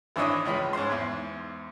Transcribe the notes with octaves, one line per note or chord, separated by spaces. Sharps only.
G#1 E3 D4 B4 C#5 D#5
C#2 G#3 C#4 B5
G#2 C#4 C5 C6
E2 G#2